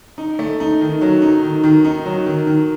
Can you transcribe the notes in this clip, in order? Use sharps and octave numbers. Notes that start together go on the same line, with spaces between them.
D#4
A3
D#4
D#3
F#3
D#4
D#3
D#3
D#4
F#3
D#3
D#3